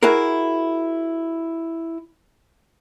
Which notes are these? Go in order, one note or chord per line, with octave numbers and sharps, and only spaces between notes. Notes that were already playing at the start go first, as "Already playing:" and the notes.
E4 F#4 G#4 A#4